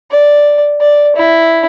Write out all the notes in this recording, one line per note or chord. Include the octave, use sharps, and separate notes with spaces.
D5
D5
E4